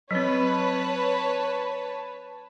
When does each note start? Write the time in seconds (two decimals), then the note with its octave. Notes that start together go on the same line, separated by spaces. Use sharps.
0.11 F#3 C4 B4 C#5 A5